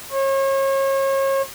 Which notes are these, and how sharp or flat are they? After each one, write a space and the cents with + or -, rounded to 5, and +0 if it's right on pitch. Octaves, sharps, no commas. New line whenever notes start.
C#5 -35